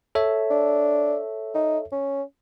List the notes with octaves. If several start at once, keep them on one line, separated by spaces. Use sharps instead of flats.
A4 C#5 E5
D4
D#4
C#4